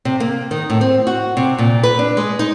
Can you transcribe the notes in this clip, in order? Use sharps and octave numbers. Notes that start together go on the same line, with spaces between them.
C3
A#3
D#3
A2
C4
F#4
C3
A#2
B4
D4
G#3
D#4